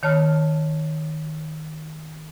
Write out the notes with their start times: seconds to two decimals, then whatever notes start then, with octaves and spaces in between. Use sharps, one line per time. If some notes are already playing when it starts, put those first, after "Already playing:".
0.03 D#3 C#5 A5 F6